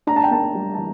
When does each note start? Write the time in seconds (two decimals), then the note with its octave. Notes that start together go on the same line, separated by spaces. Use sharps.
0.07 D4 A#5
0.16 A5
0.24 G5
0.31 A#3 A5
0.55 G3
0.74 A5
0.78 E3